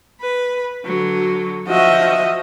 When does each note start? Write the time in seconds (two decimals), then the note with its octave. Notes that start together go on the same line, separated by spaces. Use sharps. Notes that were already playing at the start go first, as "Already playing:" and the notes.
0.21 B4
0.85 D3 F#3
1.68 F3 F#4 D#5 E5